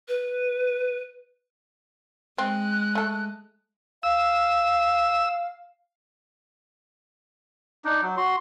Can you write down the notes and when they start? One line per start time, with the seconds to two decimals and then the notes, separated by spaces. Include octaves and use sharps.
0.08 B4
2.38 G#3 C4 F#6
2.95 A3 A4
4.03 F5 E6
7.85 D4 D#4
8.02 F#3
8.17 F#4 C6